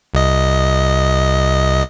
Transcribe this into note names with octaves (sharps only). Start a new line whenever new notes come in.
C2 D#5